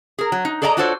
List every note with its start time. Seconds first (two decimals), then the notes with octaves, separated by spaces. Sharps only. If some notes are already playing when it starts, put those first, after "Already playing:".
0.18 G#4 A#4
0.32 F#3
0.45 D#4
0.62 G#4 A4 D5 D#5 G#5 A#5
0.77 D4 F4 F#4 A4 C5 C#5